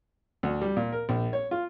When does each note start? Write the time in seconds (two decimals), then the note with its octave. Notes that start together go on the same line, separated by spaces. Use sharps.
0.43 D2
0.62 G3
0.76 A#2
0.92 A#4
1.09 A#1
1.33 C#5
1.51 F4